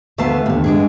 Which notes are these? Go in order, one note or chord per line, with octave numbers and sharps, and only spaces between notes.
D2 A3 B3 E5 F5 A5
D#2 D3
G#3 D4 G#4